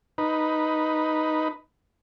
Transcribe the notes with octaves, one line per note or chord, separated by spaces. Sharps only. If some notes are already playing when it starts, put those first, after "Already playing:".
D#4 B4